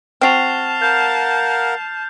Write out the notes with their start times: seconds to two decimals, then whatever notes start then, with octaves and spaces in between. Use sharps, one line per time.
0.21 C4 F#4 A5 F6 C7 F7
0.82 A#4 F5 F#5 G6